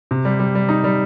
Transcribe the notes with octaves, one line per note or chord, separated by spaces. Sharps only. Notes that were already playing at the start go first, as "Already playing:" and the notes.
C3
G3
G3
G3
D#4
G3